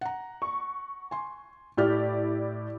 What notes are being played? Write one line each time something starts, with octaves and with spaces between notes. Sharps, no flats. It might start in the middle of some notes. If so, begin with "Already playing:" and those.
F#5 A#5
C#6
G#5 C6
A2 E4 G4 D5 F6